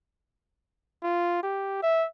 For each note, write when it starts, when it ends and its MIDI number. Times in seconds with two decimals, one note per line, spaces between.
1.03 1.42 65
1.43 1.80 67
1.83 2.07 76